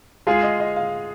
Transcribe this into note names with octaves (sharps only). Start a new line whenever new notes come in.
G#3 F4 G#4 F5
D#5
D#5
F5